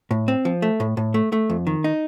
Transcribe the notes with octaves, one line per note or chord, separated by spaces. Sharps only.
A2
C4
F3
A3
A2
A2
A3
A3
F2
D#3
D#4